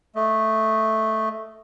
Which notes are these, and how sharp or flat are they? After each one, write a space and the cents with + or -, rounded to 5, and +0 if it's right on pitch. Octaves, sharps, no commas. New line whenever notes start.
A3 +0 D#5 +0